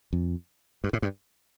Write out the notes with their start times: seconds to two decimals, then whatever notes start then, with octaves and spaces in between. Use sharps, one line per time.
0.13 F2
0.84 G2
0.93 A2
1.02 G2